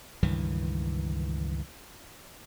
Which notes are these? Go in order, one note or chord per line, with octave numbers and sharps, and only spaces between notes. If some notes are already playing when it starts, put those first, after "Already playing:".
C#2 G2 D#3 E3